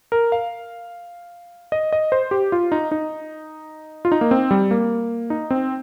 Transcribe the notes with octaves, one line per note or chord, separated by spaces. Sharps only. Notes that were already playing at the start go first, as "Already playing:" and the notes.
A#4
F5
D#5
D#5
C5
G4
F4
D#4
D#4
F4
D#4
A#3
C4
G3
A#3
D#4
C4